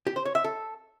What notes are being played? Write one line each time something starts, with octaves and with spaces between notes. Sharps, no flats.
G4
C5
C#5
E5
A4